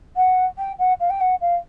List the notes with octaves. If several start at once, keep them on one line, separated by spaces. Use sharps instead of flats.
F#5
G5
F#5
F5
G5
F#5
F5